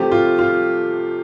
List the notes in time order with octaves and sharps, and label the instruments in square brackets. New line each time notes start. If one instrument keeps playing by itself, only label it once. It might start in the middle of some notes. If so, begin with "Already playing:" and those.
Already playing: [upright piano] C3 F3 A3 G4
F4
F4